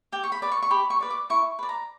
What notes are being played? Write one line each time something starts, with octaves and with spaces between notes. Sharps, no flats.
G4 G5
C#6
B5
B4 D5
C#6
C#6
G4 B5
C#6
B4 D5
D6
E4 C#6
B4 D5
A#5